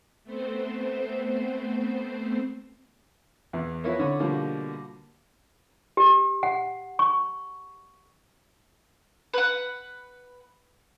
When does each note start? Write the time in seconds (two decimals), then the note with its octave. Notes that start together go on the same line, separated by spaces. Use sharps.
0.24 A3 B3 C4 C5
3.53 E2 B3
3.84 F3 B3 E4 A#4 C#5
3.99 D3 C#5
4.20 B2 D3 F3 G3 A#3
5.97 G4
6.43 F#5
6.99 C#6
9.34 B4 F#5